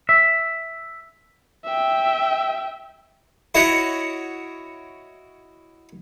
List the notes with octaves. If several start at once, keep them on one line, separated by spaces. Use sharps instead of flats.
E5
E5 G5
E4 F#4 C#5 D#5 F#5